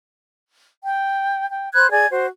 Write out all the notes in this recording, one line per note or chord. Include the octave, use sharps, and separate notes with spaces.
G5
G5
C5 B5 F#6 G#6
G#4 D5 G#5 G#6
F#4 C5